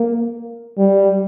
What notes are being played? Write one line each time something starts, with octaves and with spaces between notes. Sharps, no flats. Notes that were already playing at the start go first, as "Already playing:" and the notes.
Already playing: A#3
G3